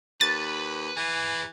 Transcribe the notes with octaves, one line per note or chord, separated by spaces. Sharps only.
D#2 B4 A6
E3 G#4 B4